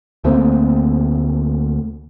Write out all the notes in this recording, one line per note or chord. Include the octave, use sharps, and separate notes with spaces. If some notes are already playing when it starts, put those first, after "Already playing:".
D2 A3 A#3 C4